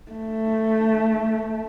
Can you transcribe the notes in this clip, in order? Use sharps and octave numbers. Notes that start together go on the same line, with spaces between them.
A3